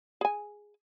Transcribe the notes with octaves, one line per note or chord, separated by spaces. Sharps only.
G#4 G#5